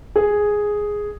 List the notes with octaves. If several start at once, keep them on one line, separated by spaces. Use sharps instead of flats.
G#4